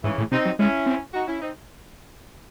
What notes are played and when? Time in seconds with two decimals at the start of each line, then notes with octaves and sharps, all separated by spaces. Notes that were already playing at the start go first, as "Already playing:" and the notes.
0.04 G#2 C#3 E3
0.18 A2
0.31 C3 C4 D#4
0.45 F#3
0.59 G#3 C#4 E4
0.86 C4
1.13 D#4 F#4
1.28 C#4 E4
1.41 C4 D#4